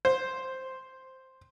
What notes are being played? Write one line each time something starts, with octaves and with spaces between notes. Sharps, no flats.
C5